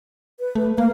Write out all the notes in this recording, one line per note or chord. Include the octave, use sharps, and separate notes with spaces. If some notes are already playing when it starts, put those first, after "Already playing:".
B4
A3
A#3 F5